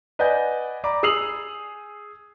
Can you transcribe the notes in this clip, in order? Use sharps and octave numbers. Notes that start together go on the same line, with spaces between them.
B4 D5 D#5 F#5 G#5 G6
D5 A#5 B5 D6
G#4 D#6 E6 C7 F7 F#7